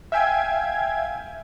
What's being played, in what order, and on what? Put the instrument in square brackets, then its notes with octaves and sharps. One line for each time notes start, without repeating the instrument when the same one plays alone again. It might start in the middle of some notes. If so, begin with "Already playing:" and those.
[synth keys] E5 F5 G5 G#5 G#6